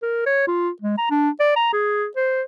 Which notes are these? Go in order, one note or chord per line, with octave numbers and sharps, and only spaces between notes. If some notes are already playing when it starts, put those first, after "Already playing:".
A#4
C#5
F4
G#3
A#5
D4
D5
A#5
G#4
C5